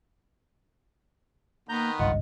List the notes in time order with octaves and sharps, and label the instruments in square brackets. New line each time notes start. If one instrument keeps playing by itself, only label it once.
[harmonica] D#3 B3 [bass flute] A#3 [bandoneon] A#5 G6
[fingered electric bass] G#1 C#2 G2 [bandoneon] F4 F#5 [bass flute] D#5